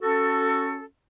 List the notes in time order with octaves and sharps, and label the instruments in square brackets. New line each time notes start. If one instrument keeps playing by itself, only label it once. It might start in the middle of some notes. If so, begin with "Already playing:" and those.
[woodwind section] C#4 F#4 A4